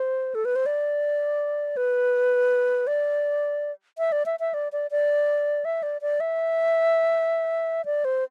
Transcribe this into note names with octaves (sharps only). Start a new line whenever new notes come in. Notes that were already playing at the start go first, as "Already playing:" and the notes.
Already playing: C5
A4
B4
C5
D5
B4
D5
E5
D5
E5
E5
D5
D5
D5
E5
D5
D5
E5
D5
C5